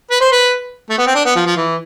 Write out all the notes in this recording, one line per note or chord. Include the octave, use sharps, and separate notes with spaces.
B4
C5
B4
A3
B3
C4
D4
B3
F3
F3
E3